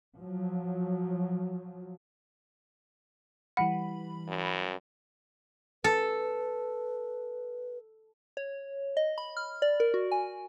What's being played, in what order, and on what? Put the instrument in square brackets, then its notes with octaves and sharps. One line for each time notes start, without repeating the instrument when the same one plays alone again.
[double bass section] F3 F#3
[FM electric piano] E3 G3 B5 [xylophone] F#5
[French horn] F#2
[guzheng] A4 [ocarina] B4
[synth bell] C#5
D#5
B5
F6
D5
A#4
F#4
G#5